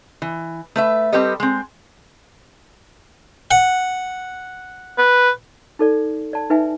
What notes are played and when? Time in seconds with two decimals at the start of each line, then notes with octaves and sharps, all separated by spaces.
0.22 E3
0.76 A3 B4 E5
1.13 G3 C4 G4 A4 B4 D#5
1.40 G#3 C4
3.51 F#5
4.98 B4
5.79 D#4 A4 D5
6.33 D5 A5
6.50 D#4 B4 E5 G#5